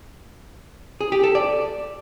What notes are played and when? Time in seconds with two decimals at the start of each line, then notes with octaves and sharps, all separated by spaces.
1.01 G#4
1.12 G4
1.23 A4
1.35 D5